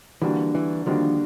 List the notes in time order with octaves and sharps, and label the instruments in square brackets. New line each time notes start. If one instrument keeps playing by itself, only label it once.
[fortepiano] D3 G3 A#3 D4 F#4 [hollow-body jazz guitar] E3
[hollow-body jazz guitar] E3
[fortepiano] D3 G3 A#3 D4 F#4 [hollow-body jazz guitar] D#3 F3